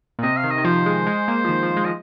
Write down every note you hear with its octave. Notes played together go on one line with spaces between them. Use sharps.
A#2
C3 D#5
F5
D#3
D#5
D#3
F3 C5
G#3
G#3
A#3
F3
D#3
F3
G#3
F3 D#5